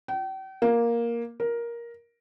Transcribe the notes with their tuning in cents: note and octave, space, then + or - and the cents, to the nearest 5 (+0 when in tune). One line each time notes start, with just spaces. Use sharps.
G5 -40
A#3 +5
A#4 +10